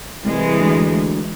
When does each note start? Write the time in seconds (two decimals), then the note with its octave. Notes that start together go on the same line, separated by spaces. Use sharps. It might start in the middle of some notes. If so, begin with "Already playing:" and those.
0.25 C2 E3 G#3
0.60 D2